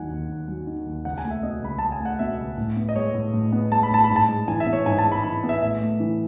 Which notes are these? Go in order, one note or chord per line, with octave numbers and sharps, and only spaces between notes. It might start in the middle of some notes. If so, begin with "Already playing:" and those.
Already playing: D#2 D#3 F#3 F#5 G#5
D#2
D#2
F#3
D#3
D#2
C#2 F#5
G#5
A3
E5
B2 D#5
C#2 B5
C#2 A5
G#5
A3
F#5
B2 E5
C#2
A2
B3
D#5
G#3 C#5
A2
A2
B3
G#3 A5
B5
A2 A5
B5
G#2
A5
G#3
E3 G#5
E5
B3
C#5
G#2 G#5
A5
G#3
B5
E3 B5
B3
E5
A2 E5
A3
E3